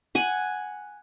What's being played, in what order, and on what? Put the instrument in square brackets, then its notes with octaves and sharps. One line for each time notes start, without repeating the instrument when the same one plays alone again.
[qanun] F#5 G#5